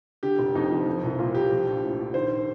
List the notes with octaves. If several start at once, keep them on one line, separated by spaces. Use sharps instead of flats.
D3 G4
F1
F2 D#4
F3
F3
C2
A#2 F4
C2 G4
F3
A#1
A2
A#1
D#3 C5